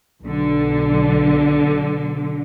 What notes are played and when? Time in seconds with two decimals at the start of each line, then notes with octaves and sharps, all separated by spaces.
0.22 B1 D3